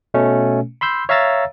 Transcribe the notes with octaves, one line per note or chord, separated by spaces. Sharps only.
B2 A3 C#4
B5 C6 E6 G6
C#5 E5 F5 A#5 E6 A6